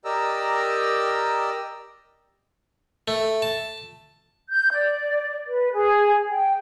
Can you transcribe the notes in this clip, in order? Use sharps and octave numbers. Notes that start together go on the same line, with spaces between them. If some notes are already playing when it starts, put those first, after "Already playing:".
G4 A#4 D5 D#5 A#5 E6
A3
A5
G6
D5
B4
G#4
G5